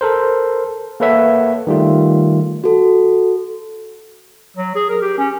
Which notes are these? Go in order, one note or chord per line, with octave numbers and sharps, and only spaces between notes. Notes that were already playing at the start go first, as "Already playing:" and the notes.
A4 A#4 C5
A#3 A4 B4 C#5 E5 F#5
D#3 G3 A3 F4
F#4 A4
F#3
G#4
A#4
G4
C#4